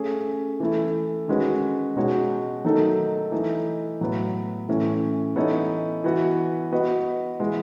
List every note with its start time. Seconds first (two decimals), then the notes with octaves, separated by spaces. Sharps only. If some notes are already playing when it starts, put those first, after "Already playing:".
Already playing: A3 C#4 G#4
0.60 E3 A3 E4
1.28 D#3 G#3 C#4 F#4 B4
1.96 B2 G#3 D#4 F#4 C#5
2.64 D#3 F#3 A3 D#4 A4
3.32 E3 A3 D#4 A4
4.01 A2 F#3 B3
4.69 A2 E3 A3 C#4
5.36 E3 B3 D#4 A4 C#5
6.04 E3 B3 F#4
6.72 B3 F#4 B4 D#5
7.40 E3 G#3 B3